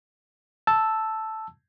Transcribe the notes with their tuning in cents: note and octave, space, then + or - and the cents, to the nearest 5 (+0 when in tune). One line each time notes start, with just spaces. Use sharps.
A5 +0 E6 +0